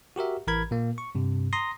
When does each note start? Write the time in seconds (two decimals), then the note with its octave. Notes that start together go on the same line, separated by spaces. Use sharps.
0.16 F#4 G4 A#4 E5
0.47 A1 E3 A#4 B5 G#6
0.71 A#2 A#3
0.98 C#6
1.15 G2 C3
1.53 A#5 C6 D#6 A#6